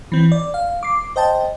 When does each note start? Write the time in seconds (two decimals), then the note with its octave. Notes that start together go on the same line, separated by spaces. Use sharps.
0.12 E3 C4
0.32 D5
0.54 F5
0.83 D6 C7
1.16 C5 D#5 G5 A5